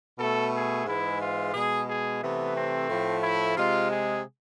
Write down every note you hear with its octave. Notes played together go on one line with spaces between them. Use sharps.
B2 A3 A4
G#4
G#2 E3 G#3 E4
F4
B2 G#3 G#4
G#4
C3 E3 A3 B3
C4
A2 F3 A3
E4
C3 G#3 F4
G#4